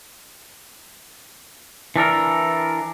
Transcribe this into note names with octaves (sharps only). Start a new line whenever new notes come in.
E3 D4 A4 A#4